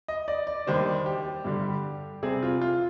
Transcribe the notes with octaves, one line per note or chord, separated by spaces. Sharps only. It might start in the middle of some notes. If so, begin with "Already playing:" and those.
D#5
D5
D5
D#2 D#3 G3 D4 C5
G4
G2 D3 G3
C3 G3 C4 G#4
F4
F4